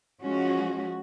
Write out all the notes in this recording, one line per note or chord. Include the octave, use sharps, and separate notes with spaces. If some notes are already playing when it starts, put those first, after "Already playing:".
F3 G#3 C#4 F#4